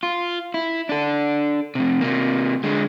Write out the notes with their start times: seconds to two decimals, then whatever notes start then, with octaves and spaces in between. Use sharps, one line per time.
0.03 F4
0.54 E4
0.89 D4 A4
1.75 F2 C3
2.01 C3 A#3
2.64 D3 G#3